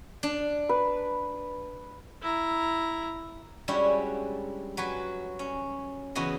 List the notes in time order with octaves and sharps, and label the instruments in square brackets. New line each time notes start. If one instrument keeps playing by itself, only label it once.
[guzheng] D4
[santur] B4
[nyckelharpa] E4 A#5
[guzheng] G3 G#3 C#4 D4 E4 F#4
F#3 F#4 B4 G#5
C#4
C#3 E3 B3 F#4 D#5 C6